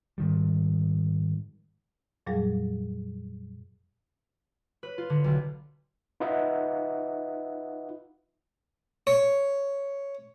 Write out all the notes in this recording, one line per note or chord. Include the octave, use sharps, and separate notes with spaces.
G#2 D#3 G3
F2 A#2 F#3 G3 G#4 F5
B4
F4
D3
B1
D#4 F4 B4 D#5 E5 F#5
C#5